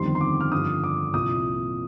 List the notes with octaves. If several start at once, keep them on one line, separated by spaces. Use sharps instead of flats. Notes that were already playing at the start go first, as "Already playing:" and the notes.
Already playing: G1 F2 D#3 G3 C4 C6
C6
D6
F6
G1 G2 D3 F3 D#6
D6
C2 A#2 F3 D#6